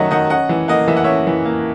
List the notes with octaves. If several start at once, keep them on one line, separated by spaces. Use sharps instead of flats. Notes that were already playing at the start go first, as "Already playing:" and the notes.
Already playing: D#3 F#3 C#4 D#5 E5 F#5
D#3 D#5 F#5
C#4 D#5 F#5
E3
A#3 D#5 F#5
E3 E5
F#5
C#4 C#5 E5
E3
A#3